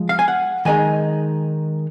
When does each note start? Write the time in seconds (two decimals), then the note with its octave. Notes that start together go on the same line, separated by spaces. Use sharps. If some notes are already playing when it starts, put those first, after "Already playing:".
Already playing: F3 G#3 F4
0.09 F5
0.19 G#5
0.28 F#5
0.65 D#3 G#3 D#4 G#5